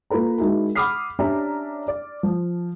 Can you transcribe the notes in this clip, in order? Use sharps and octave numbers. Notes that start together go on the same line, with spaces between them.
A#3 F4 A4 B4 A#5
G#3 D#4 E4 F#4 A#4
F#5 B5 D6 D#6 F6 C7
C#4 D4 G4 D5 E5 A#5
D5
F3